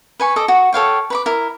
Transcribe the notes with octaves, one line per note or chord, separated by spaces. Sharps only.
B4 G#5 C#6
A4 D#5 D6
F#4
A4 C#5 F5 G5
B4 B5 D6
E4 A#4